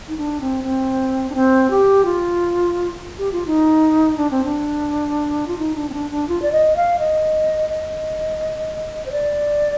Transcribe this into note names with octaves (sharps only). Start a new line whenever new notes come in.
D#4
D4
C4
C4
D4
C4
G4
F4
G4
F4
D#4
D4
C4
D4
F4
D#4
D4
C4
D4
D4
F4
D5
D#5
F5
D#5
D#5
C5
D5